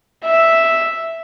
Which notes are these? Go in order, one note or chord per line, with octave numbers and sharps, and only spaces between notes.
E5